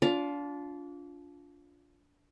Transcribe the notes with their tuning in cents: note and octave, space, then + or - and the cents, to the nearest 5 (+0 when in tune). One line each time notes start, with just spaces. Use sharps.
D4 -30 F4 +10 F5 +10